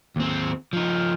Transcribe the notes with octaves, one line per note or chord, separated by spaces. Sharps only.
D#2 C4
F3 D#4